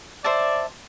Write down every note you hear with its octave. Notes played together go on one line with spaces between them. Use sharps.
C5 D5 E5 A5